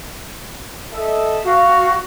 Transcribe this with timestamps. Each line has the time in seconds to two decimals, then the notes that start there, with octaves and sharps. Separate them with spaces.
0.92 A4 D#5 E5
1.44 F#4 F5